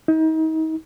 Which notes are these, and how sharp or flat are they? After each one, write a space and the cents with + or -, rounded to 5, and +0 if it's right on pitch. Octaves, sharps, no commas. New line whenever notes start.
D#4 +35